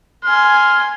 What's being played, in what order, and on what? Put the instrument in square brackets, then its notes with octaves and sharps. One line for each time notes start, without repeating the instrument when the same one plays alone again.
[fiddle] G#5 C6 [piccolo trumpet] F6